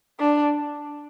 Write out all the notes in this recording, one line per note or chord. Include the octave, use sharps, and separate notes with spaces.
D4